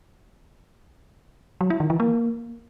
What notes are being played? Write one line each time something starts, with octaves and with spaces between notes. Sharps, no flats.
F#3
E4
D#3
E3
A#3